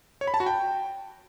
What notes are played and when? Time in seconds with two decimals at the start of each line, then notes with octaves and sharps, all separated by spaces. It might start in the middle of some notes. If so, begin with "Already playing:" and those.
0.21 C#5
0.27 B5
0.34 A5
0.40 F#4
0.46 G5